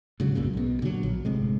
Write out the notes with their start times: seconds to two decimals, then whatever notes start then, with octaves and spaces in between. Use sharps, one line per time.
0.20 G#2 C#3 F#3
0.35 B1 F#2 A#2 C#3
0.54 B1 B2
0.82 A#2 D3 D#3 F#3
1.03 A#1
1.25 G1 A2 C3 G#3